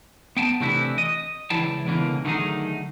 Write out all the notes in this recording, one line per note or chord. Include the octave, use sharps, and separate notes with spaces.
B3 G5 A5
C3 E3 A3 C4 D4 E4
D#5
C#2 E3 E4 D5 G5 A5
C#2 B2 D3 E3 A#3
D3 D#3 F#3 A3 D#4 G#4